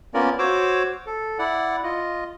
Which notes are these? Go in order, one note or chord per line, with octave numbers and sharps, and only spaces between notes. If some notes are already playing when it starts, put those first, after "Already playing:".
A#3 B3 C#4 F4 A#4 D5
F#4 C5 C#5 D6 E6
A4
E4 D5 F#5
F4 D#5